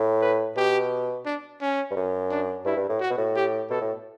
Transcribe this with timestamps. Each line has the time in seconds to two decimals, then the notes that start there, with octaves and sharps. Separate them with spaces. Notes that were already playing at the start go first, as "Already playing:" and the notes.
Already playing: A2
0.22 B4
0.56 B2 G4
1.25 D4
1.61 C#4
1.91 G2
1.96 F#2
2.31 D4
2.65 G2 E4
2.77 G2
2.89 A2
3.00 F#4
3.10 B2
3.18 A2
3.36 G4
3.70 B2 A4
3.81 A2